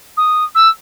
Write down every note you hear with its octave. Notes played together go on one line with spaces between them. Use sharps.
D#6
E6